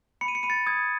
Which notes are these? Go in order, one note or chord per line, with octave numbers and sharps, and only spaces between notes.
B5 C#7
D#7
C#7
B5 D#7
A6 C#7
D#6 G#6